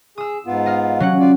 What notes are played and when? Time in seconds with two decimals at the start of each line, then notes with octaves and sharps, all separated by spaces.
0.18 G#4 D#6 E6
0.46 G#2 B3 F4
0.66 D#5 F5
1.00 F#3 C#4 F#5
1.20 F4 D5